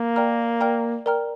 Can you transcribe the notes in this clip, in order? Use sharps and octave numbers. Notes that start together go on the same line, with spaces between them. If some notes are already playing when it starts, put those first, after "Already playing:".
Already playing: A#3
A#4 D5 G5 A#5 F6
A#4 D5 G5 A#5 F6
A#4 D5 G5 A#5 F6